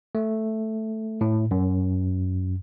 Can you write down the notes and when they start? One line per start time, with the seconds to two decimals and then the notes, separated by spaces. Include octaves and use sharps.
0.15 A3
1.21 A2
1.51 F#2